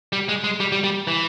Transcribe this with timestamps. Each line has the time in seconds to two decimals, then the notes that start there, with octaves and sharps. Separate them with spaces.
0.13 G3
0.29 G#3
0.44 G#3
0.60 G3
0.72 G3
0.84 G3
1.07 E3